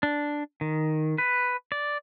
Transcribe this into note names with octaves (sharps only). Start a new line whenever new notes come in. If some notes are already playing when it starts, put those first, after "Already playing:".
D4
D#3
B4
D5